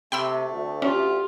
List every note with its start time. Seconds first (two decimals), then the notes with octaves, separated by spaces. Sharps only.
0.12 C3 A3 G5 B5 E6
0.50 D2
0.82 C#4 F4 G4